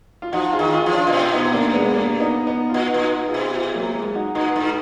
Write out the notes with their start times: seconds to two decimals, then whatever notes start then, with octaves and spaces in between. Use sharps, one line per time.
0.22 F4
0.32 F3 D#4 F#4
0.53 F4 G#4
0.59 D#3
0.73 F4 G#4
0.86 F3
0.93 D4 F4
1.07 A#2
1.13 B2
1.33 B3 D#4
1.53 A#3 D4
1.74 G#3 B3
1.94 A#3 D4
2.20 B3 D#4
2.47 B3 D#4
2.69 F4
2.74 A#2 D#4 F#4
2.94 A#2
3.01 D#4 F#4
3.27 F4 G#4
3.34 B2
3.55 F4 G#4
3.75 F#3 A#3
3.95 G#3
4.15 D#4 F#4
4.35 A#2 D#4 F#4
4.56 G#2